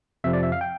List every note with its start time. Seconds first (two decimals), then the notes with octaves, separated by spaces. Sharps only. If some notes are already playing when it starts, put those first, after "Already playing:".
0.24 F2 C3 F3 E5
0.33 D5
0.43 E5
0.52 F5
0.61 G5